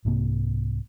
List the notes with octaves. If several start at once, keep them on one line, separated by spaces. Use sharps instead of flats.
C2 G#2 C3 A#3